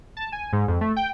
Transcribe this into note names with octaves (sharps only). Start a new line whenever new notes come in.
A5
G#5
G#2
F2
A3
G5